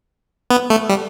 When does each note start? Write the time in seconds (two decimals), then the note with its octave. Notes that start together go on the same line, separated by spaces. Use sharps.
0.50 B3
0.70 A3
0.89 G3